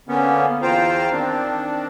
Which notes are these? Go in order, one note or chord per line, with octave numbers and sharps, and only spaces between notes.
D3 A#3 B3 C#4
E2 F4 C5 F5 G5 A#5
D#3 C4 D4